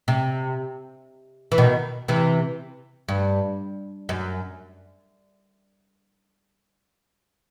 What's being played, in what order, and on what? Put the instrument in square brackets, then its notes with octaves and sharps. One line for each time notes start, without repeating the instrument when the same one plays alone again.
[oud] C3
E3
B2 D#3
C3 E3
G2
F#2